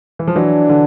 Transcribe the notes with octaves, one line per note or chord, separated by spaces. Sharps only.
E3
F3
E3 F#3 D4
D3